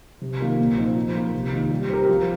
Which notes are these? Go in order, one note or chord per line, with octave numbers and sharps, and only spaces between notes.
C3
D#3 A#3 F4 A#4
A#2
F3 C4 D#4
F3
A#3 F4 A#4
C3
D#3 A#3 F4
G3
C4 G4 A#4
F3